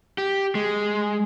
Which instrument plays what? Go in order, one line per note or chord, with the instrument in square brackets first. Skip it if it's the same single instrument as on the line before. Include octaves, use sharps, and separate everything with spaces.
[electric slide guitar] G4
G#3